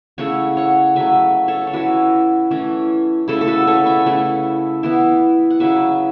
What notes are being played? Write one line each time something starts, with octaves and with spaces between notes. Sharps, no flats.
C#3 A3 E4 C#5 F#5
C#5 F#5
C#3 F#3 A3 B4 E5
A4 C#5
C#5
E3 C#4 E4 F#4 B4
E3 A3 C#4
C#3 A3 E4 A4
A4
F#4 B4
A4 C#5
B4 E5
C#3 A3 E4
E3 B3 E4
F#5
C#3 F#3 C#4 E4 B4 E5